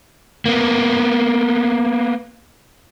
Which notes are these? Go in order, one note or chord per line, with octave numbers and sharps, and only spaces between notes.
A#3 B3